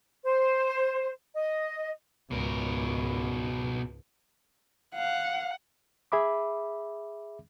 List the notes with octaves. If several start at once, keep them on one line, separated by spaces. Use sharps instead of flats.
C5
D#5
C#2 G#2 B2 A#4
F5 F#5
G#4 E5 B5 D6